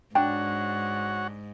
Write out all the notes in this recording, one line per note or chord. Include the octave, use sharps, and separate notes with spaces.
G#2 D4 F#4 C#5 F#5 G5